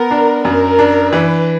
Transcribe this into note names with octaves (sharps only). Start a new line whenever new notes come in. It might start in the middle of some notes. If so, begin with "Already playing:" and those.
Already playing: B3 A#4
D4
F#2 A#4
D4
E3 B4